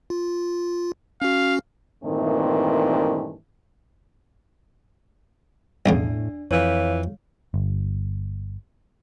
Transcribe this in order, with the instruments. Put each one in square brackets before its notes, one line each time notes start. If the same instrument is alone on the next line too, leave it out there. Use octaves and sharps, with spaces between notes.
[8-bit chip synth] F4
[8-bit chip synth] C#4 F#4 [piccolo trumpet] F5
[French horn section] G2 A#2 D#3 E3 A3 C4
[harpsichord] B1 E2 C#3 [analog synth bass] A2 [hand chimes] D4
[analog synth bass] F2 [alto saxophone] E3 [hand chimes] C#5 F5
[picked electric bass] G1